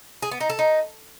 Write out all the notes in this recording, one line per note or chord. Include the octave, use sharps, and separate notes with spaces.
G#4
B3
D#4
A4
D#4